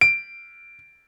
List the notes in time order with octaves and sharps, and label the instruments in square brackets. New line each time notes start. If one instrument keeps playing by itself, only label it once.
[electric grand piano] D7